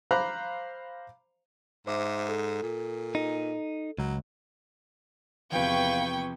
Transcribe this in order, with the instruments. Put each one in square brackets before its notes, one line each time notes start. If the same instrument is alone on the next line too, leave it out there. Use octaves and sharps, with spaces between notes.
[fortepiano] C5 F5 A#5 B5 D6 F#6
[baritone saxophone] G#2 [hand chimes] C5 E5 D6
[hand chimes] A4
[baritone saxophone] A#2
[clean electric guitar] D#4
[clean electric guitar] C#2 [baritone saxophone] F#3
[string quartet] E2 B4 G#6 [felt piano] C3 F3 [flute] F5 [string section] G5 C#6